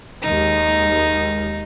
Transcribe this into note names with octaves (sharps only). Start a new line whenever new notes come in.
D#2 D#3 G#3 D#4